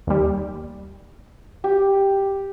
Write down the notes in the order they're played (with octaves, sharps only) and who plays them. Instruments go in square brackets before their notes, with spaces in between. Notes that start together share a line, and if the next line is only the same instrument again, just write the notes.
[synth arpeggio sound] D#2 G3
[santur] G4